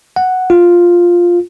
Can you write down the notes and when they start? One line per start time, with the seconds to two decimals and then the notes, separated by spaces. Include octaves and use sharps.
0.16 F#5
0.50 F4